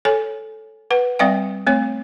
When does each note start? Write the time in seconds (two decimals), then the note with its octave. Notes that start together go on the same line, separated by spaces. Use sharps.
0.05 A4 C#5 G#5
0.91 B4 F#5
1.19 G3 C4 D5 F5 G5
1.67 A3 C4 C#5